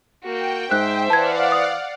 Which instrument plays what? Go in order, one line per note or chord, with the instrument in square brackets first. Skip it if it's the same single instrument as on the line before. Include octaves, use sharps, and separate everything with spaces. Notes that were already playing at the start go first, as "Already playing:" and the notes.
[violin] A#3 F#4 [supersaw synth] G5
[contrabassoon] G#2 [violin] C5 E5 [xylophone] F#6
[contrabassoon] E3 [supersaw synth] D5 F5 F#5 [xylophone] A5 G#6
[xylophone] D#6